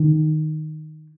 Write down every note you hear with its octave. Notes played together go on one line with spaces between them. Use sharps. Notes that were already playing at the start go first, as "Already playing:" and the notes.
Already playing: D#3